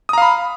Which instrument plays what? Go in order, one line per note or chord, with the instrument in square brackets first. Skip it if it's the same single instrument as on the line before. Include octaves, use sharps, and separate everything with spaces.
[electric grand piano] D#6
A#5
F5
B5